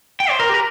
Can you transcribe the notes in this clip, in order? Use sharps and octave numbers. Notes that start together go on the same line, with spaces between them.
G5
C5
A#4
G4
A#4